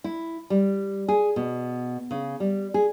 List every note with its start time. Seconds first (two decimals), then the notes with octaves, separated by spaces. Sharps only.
0.04 E4
0.50 G3
1.08 G#4
1.36 B2
2.11 C#3
2.40 G3
2.74 G#4